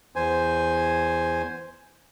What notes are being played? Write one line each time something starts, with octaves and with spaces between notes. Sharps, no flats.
E2 C5 G#5